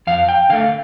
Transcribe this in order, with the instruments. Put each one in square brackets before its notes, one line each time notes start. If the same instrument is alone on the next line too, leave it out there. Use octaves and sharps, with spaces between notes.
[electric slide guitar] F2 F5
G5
D3 A3 F5